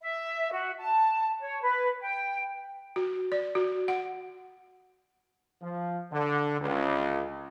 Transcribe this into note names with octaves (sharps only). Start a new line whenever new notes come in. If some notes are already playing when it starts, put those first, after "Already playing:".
E5
F#4
A5
C#5
B4
G5
F#4
D5
F#4
F#5
F3
D3
C#2